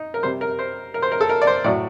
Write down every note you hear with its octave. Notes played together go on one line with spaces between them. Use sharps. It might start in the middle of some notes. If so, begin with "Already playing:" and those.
Already playing: D#4
A#4
C3 G3 C5
A#4
C5
A#4
C5
A#4
A4
A#4
D5
C5
A2 F#3 D5